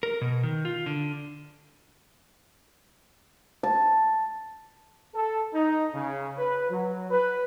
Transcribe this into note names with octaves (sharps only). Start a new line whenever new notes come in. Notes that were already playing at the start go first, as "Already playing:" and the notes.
A#4
B2
D#3
F4
D3
A5
A4
D#4
C#3
B4
F#3
B4